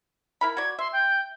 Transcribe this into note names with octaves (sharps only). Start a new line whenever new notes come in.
E4 A#4 B5
F#4 D5 G#6
E5 C6
G5